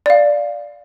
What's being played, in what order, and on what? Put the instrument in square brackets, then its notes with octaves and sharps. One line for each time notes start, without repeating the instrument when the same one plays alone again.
[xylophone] D5 F5